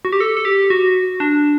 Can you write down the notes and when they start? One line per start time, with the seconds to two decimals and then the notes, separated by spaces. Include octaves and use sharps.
0.05 F#4
0.12 G4
0.20 A4
0.37 A4
0.45 G4
0.70 F#4
1.20 D4